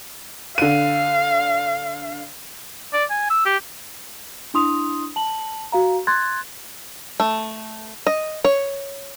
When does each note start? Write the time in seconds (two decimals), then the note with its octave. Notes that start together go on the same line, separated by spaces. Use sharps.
0.58 D3 F5 D#7
2.93 D5
3.10 G#5
3.30 E6
3.46 G4
4.54 D4 E4 C6 D#6 F7
5.16 A5 F#7
5.72 F#4 F5 A#5
6.07 C6 F#6 G#6 A6
7.20 A3
8.07 D#5
8.45 C#5